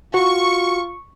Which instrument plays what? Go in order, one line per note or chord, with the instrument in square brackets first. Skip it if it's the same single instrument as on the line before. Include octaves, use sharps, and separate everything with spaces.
[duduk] F4 [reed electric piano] F#4 [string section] C#6